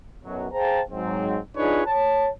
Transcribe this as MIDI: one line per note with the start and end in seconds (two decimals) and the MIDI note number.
0.24 0.47 35
0.24 0.47 42
0.24 0.47 47
0.24 0.47 54
0.53 0.81 68
0.53 0.81 72
0.53 0.81 77
0.53 0.81 79
0.53 0.81 81
0.53 0.81 82
0.91 1.37 44
0.91 1.37 54
0.91 1.37 60
1.57 1.82 62
1.57 1.82 63
1.57 1.82 65
1.57 1.82 68
1.57 1.82 71
1.57 1.82 73
1.86 2.29 73
1.86 2.29 81